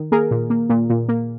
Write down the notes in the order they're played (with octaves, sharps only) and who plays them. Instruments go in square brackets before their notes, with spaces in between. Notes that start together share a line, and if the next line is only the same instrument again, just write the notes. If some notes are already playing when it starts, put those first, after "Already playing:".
Already playing: [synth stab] D#3
A#3 G#4 A#4
A#2
A#3
A#2
A#2
A#3